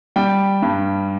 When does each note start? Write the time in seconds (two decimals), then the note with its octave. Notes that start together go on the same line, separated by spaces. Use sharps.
0.16 G3 G5
0.62 G2